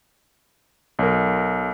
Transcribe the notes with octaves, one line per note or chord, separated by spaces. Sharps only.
B1 A#4